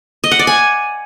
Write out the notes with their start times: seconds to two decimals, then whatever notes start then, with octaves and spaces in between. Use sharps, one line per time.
0.24 D#5
0.31 F#5
0.39 D5
0.47 G#5